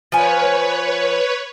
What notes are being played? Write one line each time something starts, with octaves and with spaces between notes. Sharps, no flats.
F3 B4 C#5 G#5